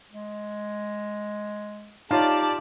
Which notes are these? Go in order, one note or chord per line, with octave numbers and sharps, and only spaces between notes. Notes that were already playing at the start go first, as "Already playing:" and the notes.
G#3
D#4 F4 G4 C#5 D5 F5 A5